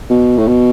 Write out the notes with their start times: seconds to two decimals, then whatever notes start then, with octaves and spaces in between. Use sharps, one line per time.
0.10 B2
0.38 A2
0.47 B2